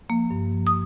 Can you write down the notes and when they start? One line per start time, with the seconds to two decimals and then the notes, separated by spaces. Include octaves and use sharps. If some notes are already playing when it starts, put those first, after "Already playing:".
0.09 F3 A#3
0.31 G2
0.51 F3 A#3
0.67 D#6